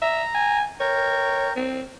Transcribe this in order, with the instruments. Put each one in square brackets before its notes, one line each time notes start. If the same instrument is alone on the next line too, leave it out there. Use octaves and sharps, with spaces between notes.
[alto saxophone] E5 [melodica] A#5
[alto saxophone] G#5
[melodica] A#4 G5 [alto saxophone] C#5
[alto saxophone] C4